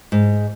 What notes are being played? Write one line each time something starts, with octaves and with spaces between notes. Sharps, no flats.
G#2